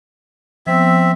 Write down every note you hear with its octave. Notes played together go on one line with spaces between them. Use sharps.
F3 B3 C4 E5